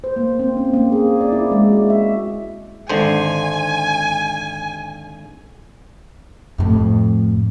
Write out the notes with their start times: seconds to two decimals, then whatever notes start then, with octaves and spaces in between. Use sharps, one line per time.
0.04 C5
0.16 A#3
0.39 C4
0.57 C#4
0.73 A#3
0.92 G#4
1.21 D5
1.32 E4
1.52 G#3
1.72 F#4
1.90 E5
2.89 G#1 D3 C5 G#5
6.58 F2 A2